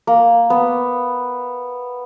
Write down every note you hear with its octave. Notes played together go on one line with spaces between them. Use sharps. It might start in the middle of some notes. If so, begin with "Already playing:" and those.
A#3
B3